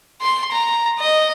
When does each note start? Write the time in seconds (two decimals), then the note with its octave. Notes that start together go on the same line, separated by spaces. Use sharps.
0.22 C6
0.51 A#5
0.99 D#5